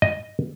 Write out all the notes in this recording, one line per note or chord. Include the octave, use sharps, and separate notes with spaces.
D#5